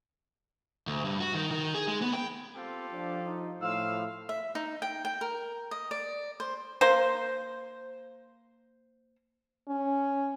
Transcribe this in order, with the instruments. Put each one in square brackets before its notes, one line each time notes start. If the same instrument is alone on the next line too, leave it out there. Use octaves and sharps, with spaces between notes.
[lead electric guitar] D2
G2
F#4
D#3
D#3
G#4
G#3
B3
G5
[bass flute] C4 [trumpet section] F4 G4 A4
[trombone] F3 [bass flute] D4
[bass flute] D#4
[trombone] A2 [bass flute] F3 [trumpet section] F5 [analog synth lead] E6
[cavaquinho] E5
D#4
G5
G5
A#4
D#5
D5
C5
[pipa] A#3 C5
[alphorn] C#4